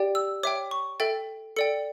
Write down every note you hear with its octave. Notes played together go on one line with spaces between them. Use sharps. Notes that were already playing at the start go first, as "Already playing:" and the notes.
Already playing: G4 D5 G5
E6
C#5 E5 G5 D6
C#6
A4 E5 G5 A6
A4 D5 G5 C#7